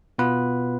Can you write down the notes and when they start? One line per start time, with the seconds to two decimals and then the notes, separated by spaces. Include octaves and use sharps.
0.18 B2 B3 F4 B4